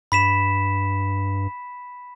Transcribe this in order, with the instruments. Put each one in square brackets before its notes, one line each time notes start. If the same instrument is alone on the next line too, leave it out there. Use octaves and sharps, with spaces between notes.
[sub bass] G2 [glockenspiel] B5 B6 E7